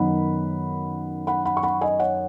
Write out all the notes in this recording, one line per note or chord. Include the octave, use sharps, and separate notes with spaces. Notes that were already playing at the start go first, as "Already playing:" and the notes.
Already playing: F#2 D#3 B3 D#4 F#5 B5
F#5 B5
F#5 B5
C#6
F#5 B5
D#5 G#5
C#5 F#5